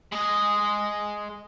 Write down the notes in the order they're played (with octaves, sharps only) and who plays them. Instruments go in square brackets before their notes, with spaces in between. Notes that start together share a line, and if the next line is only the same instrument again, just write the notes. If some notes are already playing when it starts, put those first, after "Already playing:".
[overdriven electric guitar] G#3 D#5